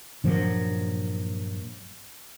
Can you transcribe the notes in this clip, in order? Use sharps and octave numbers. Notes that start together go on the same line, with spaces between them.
G2 A#2 F3 F#3